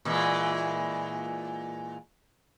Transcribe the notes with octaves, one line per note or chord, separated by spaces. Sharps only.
A#2 E3 G#3